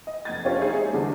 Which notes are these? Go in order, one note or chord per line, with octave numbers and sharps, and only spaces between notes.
D#5
F1 G#6 A6
C#4 D4 F4 G4 C#5
D#4 G#4 C#5 E5
G#3
E2 D3 G3 A3 D4